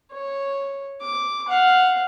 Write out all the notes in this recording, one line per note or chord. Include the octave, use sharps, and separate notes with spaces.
C#5
D6
F5 F#5